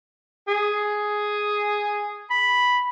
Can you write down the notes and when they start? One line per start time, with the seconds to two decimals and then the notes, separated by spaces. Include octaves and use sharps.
0.48 G#4
2.30 B5